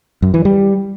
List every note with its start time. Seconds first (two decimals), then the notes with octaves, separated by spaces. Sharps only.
0.22 F#2
0.34 E3
0.45 G3